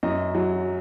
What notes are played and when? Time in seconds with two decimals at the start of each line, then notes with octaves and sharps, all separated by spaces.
0.03 F#2 D#5
0.35 F#3